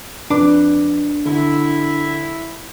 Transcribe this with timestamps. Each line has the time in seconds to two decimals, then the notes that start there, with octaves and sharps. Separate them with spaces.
0.30 F2 D4 B4 D6
1.26 D3 E4